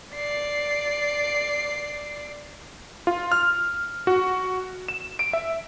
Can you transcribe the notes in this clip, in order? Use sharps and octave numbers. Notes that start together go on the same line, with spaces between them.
D5 C7
F4
F6
F#4
E7
D7
E5